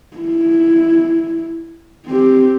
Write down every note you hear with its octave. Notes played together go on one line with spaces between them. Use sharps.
E4
C4 G4